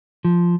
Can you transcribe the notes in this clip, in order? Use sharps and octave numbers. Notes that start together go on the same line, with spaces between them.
F3